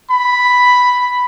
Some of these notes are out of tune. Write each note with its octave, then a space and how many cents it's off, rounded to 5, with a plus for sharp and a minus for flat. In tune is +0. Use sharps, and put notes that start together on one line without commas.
B5 +0